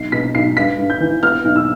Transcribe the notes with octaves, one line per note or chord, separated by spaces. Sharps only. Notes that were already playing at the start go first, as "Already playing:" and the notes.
Already playing: B1 C7
B2 B6
B1 C7
G2 B6
G2
G6
E3
B3 F6
B1
E6